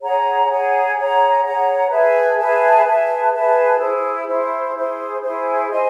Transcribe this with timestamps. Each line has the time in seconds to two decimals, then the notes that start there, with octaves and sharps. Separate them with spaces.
0.01 G#4 C#5 F#5 A#5
0.48 G#4 C#5 F#5 A#5
0.96 G#4 C#5 F#5 A#5
1.43 G#4 C#5 F#5 A#5
1.90 G#4 B4 E5 A5
2.37 G#4 B4 E5 A5
2.85 G#4 B4 E5 A5
3.32 G#4 B4 E5 A5
3.79 E4 G#4 C5
4.26 E4 G#4 C5
4.74 E4 G#4 C5
5.21 E4 G#4 C5
5.68 C5 D#5 G#5 C6